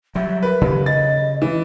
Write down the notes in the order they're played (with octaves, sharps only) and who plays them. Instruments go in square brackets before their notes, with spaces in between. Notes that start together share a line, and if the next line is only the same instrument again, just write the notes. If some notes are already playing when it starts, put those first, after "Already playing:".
[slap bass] F#3 G3 [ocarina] E5
[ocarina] A#4 [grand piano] B4
[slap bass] C#3 [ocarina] G4
[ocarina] D#5 [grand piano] A6
[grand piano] E3